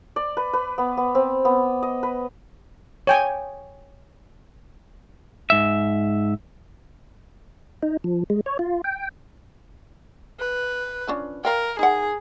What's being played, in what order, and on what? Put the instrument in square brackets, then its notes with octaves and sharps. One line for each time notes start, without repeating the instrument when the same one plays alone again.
[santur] D5
B4
B4
B3
B3
C4
B3
D#5
B4
[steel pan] C#5 G5 G#5
[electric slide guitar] G#2 E5
[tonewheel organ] D#4
F3
G#3
C#5
F4
G5
[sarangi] B4
[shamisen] F3 C#4 D4
[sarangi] A#4 [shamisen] D5 F5 G5
[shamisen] D#4 F#5 [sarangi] G#4